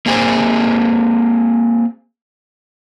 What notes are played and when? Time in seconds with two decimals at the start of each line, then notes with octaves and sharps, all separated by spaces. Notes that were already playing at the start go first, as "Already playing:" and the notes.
0.06 A#3 C4 G#4 C5